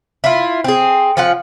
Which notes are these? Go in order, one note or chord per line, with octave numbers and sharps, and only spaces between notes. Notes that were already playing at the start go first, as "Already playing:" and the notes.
E4 F4
C4 G#4
F3 C#4 F4 F#5